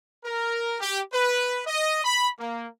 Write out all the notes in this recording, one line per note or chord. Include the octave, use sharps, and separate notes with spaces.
A#4
G4
B4
D#5
B5
A#3